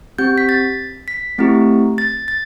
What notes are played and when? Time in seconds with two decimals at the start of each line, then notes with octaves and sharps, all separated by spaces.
0.18 C4 G4 G6
0.38 B6
0.49 A6
1.08 B6
1.38 A3 C4 E4 G4
1.98 A6
2.28 A6